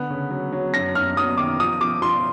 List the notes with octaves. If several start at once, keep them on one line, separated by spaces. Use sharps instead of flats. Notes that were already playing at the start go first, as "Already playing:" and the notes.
Already playing: D3 B3
C#3
F#3
F#3
F#2 A#6
F#2 F6
F#2 D#6
D#3 D6
F3 D#6
F3 D6
F3 C6